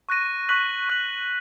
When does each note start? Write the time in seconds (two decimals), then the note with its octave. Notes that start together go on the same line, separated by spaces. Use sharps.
0.09 C#6 F#6 A#6 D#7
0.49 C#6 F#6 B6 F#7
0.89 C#6 F#6 B6 F#7